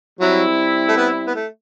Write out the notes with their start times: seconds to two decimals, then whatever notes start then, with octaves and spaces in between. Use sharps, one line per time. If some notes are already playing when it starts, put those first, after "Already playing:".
0.20 F#3 G3 C4 E4
0.88 A3
0.97 B3
1.27 B3
1.35 A3